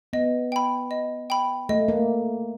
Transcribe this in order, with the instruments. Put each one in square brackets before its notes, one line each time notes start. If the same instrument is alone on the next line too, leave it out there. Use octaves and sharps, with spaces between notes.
[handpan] B3 [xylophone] D#5
[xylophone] G5 B5
D#5
G5 B5
[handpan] A3 [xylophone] D#5
[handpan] A#3